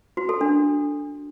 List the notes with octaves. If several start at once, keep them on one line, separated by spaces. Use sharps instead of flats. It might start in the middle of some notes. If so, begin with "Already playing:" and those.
F#4
A4
D4